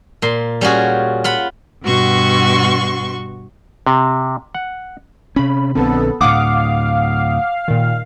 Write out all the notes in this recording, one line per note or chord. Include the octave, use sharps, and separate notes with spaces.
A#2 C6
G3 C#4 F4 F#4 G#4
F4 F#5 B5
G2 B2 F#4 C6 C#6
C3
F#5
C3 C#4 B5
A#1 D3 B3 C4 A4
D2 A2 F5 F#5 D6 D#6
A#2 D#3